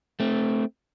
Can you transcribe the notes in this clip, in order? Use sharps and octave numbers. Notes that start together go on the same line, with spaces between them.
A3 C4